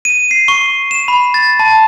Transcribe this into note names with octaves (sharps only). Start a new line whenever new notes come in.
D#7
C7
C#6
E7
B5
A6
A5